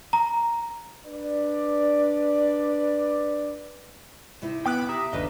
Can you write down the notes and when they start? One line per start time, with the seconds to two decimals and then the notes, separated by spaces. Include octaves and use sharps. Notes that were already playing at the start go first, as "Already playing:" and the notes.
0.13 A#5
1.07 D4 B4 D5
4.42 C3 D#4 E4
4.66 B3 G5 B5 D6 D#6 F#6
4.89 G4 E5 A#5 D#6
5.13 G1 D#2 C#3 D4 B4 D#5